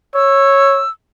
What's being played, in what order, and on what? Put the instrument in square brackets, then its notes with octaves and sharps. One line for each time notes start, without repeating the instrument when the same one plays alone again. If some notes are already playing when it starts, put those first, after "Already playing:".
[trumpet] C#5 [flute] E6